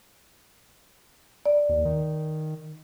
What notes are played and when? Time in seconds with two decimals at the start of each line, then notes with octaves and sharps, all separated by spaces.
1.46 D5
1.69 D#2
1.85 D#3